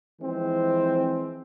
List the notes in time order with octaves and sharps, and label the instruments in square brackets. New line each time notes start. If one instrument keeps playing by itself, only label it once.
[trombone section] E3 F3 G#3 C4